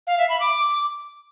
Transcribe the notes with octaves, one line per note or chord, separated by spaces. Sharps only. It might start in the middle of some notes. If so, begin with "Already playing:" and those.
F5
E5
B5
D6